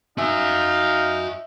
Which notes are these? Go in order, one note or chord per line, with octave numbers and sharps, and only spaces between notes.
D#4 F#4 E5 F5 G#5